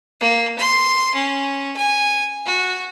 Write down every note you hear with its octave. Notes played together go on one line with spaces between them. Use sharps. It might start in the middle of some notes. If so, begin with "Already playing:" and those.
A#3
C6
C#4
G#5
F#4